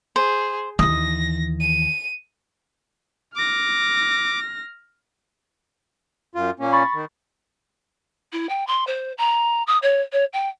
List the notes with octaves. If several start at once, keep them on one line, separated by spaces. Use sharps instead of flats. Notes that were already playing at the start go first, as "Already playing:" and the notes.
G#4 C5
D#2 E3 D#6 A#6
D#7
D6 F6 A#6
F#2 F4
A#2 A#3 C#4
B5 C#6 A6
D#3
E4
G5
C6
C5
A#5
D#6
C#5
C#5
G5